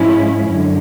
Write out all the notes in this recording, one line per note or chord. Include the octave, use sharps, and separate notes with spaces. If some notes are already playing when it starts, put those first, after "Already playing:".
Already playing: G#2 F3 G#3 C#4 E4
F#2 D3